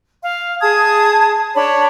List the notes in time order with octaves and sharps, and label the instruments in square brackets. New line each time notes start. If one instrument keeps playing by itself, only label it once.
[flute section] F5
G#4 A5 D#6 G#6
D4 C#5 A5 B5